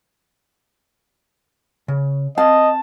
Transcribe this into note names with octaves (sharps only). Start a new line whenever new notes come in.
C#3
C4 D#5 F5 A5